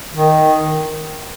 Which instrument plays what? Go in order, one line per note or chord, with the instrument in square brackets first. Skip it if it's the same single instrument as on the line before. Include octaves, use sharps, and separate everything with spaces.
[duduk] D#3